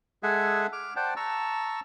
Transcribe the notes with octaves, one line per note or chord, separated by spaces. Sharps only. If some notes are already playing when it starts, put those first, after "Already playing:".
G#3 G#4 A4 E5 F#5 G#5
D6 F6
C5 D5 F#5 G5 A5
A5 A#5 C#6 E6